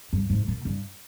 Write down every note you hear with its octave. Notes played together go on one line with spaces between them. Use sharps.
G2
G#2
A#2
G2